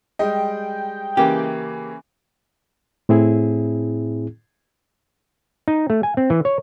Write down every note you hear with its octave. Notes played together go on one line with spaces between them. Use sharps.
G3 G#3 D#5 G5
C#3 E3 A#3 G4
A2 C4 E4 G#4
D#4
A3
G#5
C4
E3
C#5